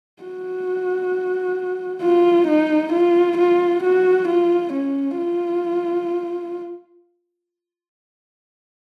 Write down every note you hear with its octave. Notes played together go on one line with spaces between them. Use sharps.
F#4
F4
D#4
F4
F4
F#4
F4
C#4
F4